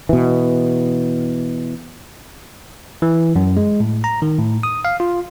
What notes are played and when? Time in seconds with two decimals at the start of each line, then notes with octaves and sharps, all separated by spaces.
0.09 B2 E3
3.02 E3
3.36 F#2
3.57 G#3
3.80 A2
4.04 A#5
4.22 D#3
4.38 A2
4.63 D#6
4.85 F5
5.00 F4